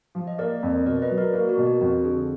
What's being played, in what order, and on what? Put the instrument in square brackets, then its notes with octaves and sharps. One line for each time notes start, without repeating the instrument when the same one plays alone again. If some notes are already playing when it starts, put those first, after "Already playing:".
[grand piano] F3
[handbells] D#5
[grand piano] A#3 [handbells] A#4 D5
[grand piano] F2
[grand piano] B2 [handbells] A#4 D5
[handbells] B4 D#5
[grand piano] F#3
[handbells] A#4 D5
[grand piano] A#3 [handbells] F#4 A#4
[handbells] F#4 A#4
[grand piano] B2
[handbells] F#4 A#4
[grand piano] F2 [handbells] F#4
[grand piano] D3 [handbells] G#4